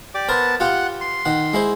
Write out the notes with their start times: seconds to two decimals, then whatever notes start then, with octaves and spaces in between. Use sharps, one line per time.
0.15 G4 D5 D6
0.29 B3 A#4 C5 A5
0.60 F4 G4 F#5
1.01 C6
1.25 D#3 F#5
1.53 G#3 E4 C5